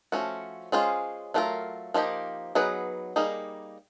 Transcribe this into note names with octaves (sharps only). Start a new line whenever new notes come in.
F3 A3 C#4 F#4
G#3 C#4 F4 G#4 C5
F#3 A3 D4 F4 A#4
F3 A#3 D#4 G4
F#3 B3 D#4 G#4 B4
G3 A#3 D#4 G#4